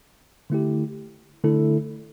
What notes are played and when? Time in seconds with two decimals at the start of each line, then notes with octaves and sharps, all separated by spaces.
0.50 D3 A3 E4 G4
1.44 D3 A3 E4 A4